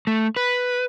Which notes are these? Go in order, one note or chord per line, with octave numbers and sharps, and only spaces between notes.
A3
B4